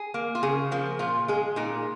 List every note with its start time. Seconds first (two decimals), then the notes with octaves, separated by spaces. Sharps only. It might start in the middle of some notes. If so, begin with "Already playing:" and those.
Already playing: G#4
0.14 A#3
0.35 F4
0.43 C#3 G#4
0.72 F3 A#3
0.99 A#2 F4
1.28 G#3 G#4
1.56 A#2 D#4